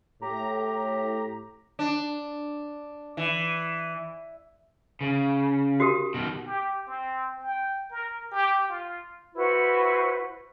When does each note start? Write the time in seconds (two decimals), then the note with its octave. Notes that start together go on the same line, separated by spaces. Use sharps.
0.22 A2 G4 A#5
1.79 D4
3.17 E3
5.01 C#3
5.80 F#4 G4 A#4
6.14 B2 D#3
6.46 G4
6.88 C4
7.41 G5
7.91 A#4
8.32 G4
8.69 F4
9.34 E4 F#4 B4 C5